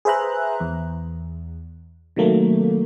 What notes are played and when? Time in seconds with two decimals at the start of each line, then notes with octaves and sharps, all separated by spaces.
0.05 G#4 B4 C5 E5 A#5 F#6
0.60 E2
2.16 C3 D#3 F#3 A3 A#3